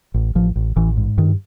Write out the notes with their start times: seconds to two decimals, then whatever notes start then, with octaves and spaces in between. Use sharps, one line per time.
0.14 A1
0.35 A1 F3
0.56 A1
0.76 A1 E3
0.97 G#2
1.18 G2 D#3